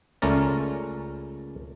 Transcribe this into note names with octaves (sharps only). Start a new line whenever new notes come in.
C#2 A3 C#4 A#4 D5